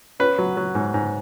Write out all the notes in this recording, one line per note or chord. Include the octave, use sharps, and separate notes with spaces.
C#4 B4
F#3
F#3
G#2
G#2